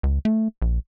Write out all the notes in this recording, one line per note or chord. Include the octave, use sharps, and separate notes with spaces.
C#2
A3
A#1